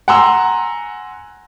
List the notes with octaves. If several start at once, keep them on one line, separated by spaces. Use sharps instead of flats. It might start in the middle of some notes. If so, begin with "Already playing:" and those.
F#5 G#5 A#5 C6 E6